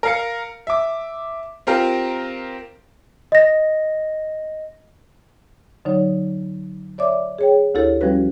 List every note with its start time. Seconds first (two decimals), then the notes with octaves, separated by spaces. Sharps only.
0.03 A#4 F5 C#7
0.67 E5 D6
1.67 C4 F4 G4 A#4
3.32 D#5 A#6
5.85 D3 F#3 D#4 C#5
6.98 C#5 D5 E5 D6
7.38 G#4 C#5 G5
7.75 D2 E4 G4 A4 C#5
8.01 F3 G3 C#4 F#4 B4